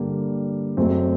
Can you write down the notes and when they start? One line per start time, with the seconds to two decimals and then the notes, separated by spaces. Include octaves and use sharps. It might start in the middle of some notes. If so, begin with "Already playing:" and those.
Already playing: G2 D3 G3 A#3
0.77 F#1 F#2 F#3 A3 C4